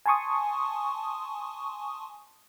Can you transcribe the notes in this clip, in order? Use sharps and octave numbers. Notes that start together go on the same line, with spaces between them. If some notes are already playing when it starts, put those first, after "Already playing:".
G#5 A5 C6 C#6 D#6